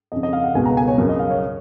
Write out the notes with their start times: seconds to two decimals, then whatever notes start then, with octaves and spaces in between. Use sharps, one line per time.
0.12 F2 C#3 D#5
0.23 D#5
0.33 F5
0.44 F#5
0.55 C#2 B2 G#5
0.66 A#5
0.77 G#5
0.88 C#5
0.98 F#2 C#3
1.09 D#5
1.19 F5
1.30 C#5